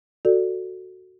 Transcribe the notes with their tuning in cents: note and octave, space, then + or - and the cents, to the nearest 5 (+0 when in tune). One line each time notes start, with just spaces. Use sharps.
F#4 +0 A4 +15 D5 +0